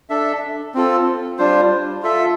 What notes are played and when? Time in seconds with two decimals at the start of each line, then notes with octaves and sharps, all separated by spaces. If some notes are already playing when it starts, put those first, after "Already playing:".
0.10 D4 A4 E5
0.74 C4 F4 A4
1.38 G3 D4 F4 C5
2.02 F4 A4 E5